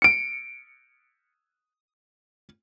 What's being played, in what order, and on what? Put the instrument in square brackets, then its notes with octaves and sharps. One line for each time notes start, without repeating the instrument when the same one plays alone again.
[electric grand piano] C#7 D7